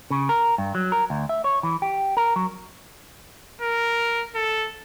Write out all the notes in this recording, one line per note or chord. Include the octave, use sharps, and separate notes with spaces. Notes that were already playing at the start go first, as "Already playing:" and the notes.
C#3
A#4
G2
F#3
A#4
D2
E5
C#5
E3
G4
A#4
F#3
A#4
A4